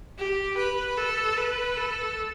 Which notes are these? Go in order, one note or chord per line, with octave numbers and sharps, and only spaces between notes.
G4
B4
A4
B4
A4